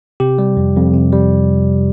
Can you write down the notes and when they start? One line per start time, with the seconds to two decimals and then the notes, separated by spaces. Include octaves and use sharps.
0.20 C3 G4
0.38 G3
0.57 F2
0.76 F2
0.94 C3
1.12 G3